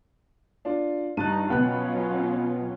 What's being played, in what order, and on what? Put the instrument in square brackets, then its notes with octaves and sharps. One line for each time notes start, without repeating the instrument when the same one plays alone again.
[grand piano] D4 F4 D5
[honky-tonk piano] G2 [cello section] G3 D#4 [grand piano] F#6 A6 D#7
[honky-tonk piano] B2 B3 [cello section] F#3 C#4 F4 [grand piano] G5 F#6